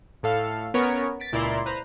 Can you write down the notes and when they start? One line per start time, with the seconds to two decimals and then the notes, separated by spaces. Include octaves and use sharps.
0.23 A2 A4 F5
0.74 B3 C#4 A#4 C#5
1.20 A6 B6 D7
1.32 C#2 A#2 E4 D5 A#5 C6
1.66 B4 C5 A#5